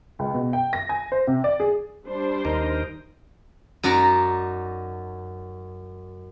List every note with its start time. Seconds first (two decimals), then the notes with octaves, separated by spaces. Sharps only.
0.19 C#2
0.34 B2
0.53 G5
0.73 A#6
0.89 G#5
1.12 C5
1.27 C3
1.44 D5
1.60 G#4
2.05 G3 D4 C5
2.45 D#2 D#4 A#4
3.83 F#2 D#4 F#4 D5 A#5